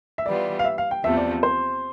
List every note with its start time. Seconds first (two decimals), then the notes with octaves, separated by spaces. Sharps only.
0.18 E5
0.26 E3 G3 B3 F4 D5
0.59 F5
0.65 E5
0.78 F5
0.91 G5
1.04 E2 C3 F3 A3 E5
1.17 D5
1.43 C5